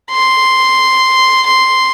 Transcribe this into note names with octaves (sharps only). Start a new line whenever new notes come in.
C6
C6